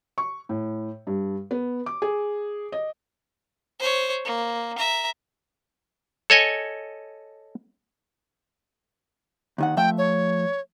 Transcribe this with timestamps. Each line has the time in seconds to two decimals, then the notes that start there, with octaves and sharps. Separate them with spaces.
0.18 C#6
0.49 A2
1.07 G2
1.51 B3
1.86 D6
2.02 G#4
2.72 D#5
3.80 C5 C#5
4.24 A#3
4.78 E5 A#5
6.30 A4 C#5 D#5 G#5
9.58 D#2 D#3 F#5
9.77 F3 A3 E5 G5
9.98 C#5